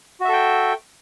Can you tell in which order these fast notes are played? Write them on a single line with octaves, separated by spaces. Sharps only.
F#4 E5 A4 G5